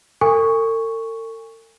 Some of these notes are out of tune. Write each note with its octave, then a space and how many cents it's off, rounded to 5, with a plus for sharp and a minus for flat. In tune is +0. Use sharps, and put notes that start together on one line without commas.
A4 +45 G#5 -30 C#6 +0